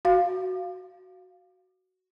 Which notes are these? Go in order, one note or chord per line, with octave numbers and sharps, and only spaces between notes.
F#4 F5